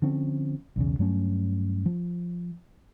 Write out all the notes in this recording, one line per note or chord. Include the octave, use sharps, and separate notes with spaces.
D3 F3 C4 C#4
B1 E2 C#3
G2 F#3 A3 C#4
F3